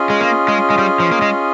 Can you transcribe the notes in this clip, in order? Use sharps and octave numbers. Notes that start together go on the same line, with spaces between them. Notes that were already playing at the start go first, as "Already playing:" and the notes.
Already playing: C#4 F4 G#4 D#5
G#3
A#3
G#3
G#3
G3
F3
A#3
G#3